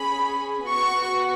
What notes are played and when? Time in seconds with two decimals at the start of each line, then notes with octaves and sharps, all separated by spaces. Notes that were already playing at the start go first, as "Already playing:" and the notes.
Already playing: C#4 G#4 B5
0.67 B3 F#4 C#6